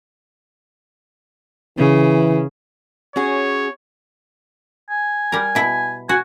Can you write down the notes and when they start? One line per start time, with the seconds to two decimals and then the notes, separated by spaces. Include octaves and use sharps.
1.78 C#3 E3
3.16 C#4 F#4 G#4 C#5
4.90 G#5
5.32 G3 A#4
5.55 B2 E4 E5
6.09 F#4 G#5